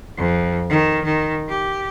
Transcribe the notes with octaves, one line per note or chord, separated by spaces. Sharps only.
F2
D#3
D#3
G4